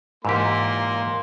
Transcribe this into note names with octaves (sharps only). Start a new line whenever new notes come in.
G#2 E3 A#3 G4 C6